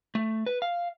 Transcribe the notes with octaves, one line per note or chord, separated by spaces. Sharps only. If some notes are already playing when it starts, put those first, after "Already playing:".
A3
B4
F5